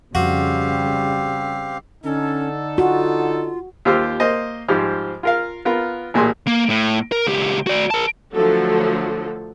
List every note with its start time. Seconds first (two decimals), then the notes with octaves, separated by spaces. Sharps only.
0.15 F2 C#3 G3 C4 F#4 G4 F5
2.04 D3 C#4 D#4 A4
2.78 F4 F#4
3.85 D#2 F4 G4 C5 E6 F6
4.20 A#3 C5 D#5
4.68 G#2 F3 G3 G4 C5 F6
5.23 F4 A#4 F5
5.65 B3 F4 A#4
6.14 A1 A#2 G#4 C6
6.47 A#3
6.70 A2
7.12 A#4
7.27 C#2 G4
7.67 F#4 D5
7.91 A#4 A5
8.32 D3 F3 F#3 A3 A4